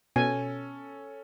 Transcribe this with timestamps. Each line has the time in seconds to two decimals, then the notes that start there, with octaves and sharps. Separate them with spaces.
0.16 B2 C#4 A4 G#5